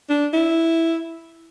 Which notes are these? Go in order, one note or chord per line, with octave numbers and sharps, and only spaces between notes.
D4
E4